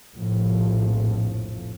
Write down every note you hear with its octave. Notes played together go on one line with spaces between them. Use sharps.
F1 A#1 A2 F3